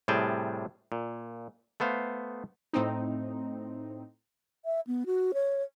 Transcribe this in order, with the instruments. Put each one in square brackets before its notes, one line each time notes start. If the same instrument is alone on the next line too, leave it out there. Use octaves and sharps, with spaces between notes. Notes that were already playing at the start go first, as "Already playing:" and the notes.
[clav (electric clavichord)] A2 C3 G3 G#4 G5 A5
A#2
A3 B3 C5 F5
[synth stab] A2 C4 D#4
[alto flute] E5
B3
F#4
C#5